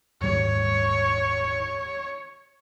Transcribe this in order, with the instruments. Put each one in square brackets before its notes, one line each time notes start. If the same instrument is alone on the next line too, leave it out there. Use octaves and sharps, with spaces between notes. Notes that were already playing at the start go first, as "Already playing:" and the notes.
[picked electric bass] D#1 G#2 G3 [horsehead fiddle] C#5